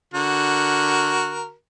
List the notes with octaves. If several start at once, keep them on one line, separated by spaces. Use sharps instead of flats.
D3 F#4 A#4